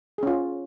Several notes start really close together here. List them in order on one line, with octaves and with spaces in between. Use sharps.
G#4 C#4 F4